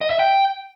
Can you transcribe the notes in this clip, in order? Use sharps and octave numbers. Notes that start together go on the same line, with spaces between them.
D#5
E5
G5